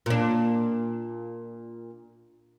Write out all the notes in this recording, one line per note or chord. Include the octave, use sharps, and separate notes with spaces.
A#2 D4